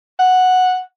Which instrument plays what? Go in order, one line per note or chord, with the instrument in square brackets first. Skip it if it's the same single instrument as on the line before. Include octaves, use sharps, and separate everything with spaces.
[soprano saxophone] F#5